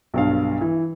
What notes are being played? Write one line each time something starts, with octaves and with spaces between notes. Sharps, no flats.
B1 G2 F5
E3